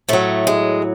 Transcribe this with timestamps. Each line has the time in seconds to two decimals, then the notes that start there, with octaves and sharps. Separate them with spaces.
0.09 A2 F#3 A3
0.47 G#3